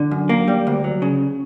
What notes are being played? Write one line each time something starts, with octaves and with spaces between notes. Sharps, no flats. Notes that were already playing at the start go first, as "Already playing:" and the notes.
Already playing: D3
F#2
A#3
G3
D2
F#3
C#3